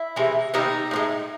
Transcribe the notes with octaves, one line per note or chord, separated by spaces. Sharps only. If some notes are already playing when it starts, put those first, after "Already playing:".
Already playing: E4
C3 E3 G#3
C3 D#3 G3 A#3 D#4
A2 F3 G#3